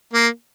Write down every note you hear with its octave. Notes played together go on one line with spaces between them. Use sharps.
A#3